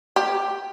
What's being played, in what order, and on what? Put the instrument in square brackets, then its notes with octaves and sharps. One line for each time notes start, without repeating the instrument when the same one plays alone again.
[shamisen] G4